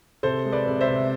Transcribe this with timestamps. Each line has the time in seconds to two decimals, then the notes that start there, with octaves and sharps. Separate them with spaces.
0.23 C3 A4 C5
0.46 G#3
0.52 B4 D5
0.67 C3
0.81 C5 E5
0.88 C3